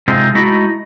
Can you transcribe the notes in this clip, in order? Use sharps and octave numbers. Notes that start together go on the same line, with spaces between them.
C3 G#3 C4 D#4 F4
G#3 A3 D#4 E4 F#4